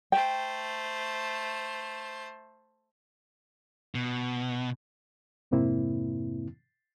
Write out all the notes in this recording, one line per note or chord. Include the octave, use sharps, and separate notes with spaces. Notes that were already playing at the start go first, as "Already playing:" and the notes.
A3 C5 G5
B2
F2 G#2 C3 A#3 C4 E4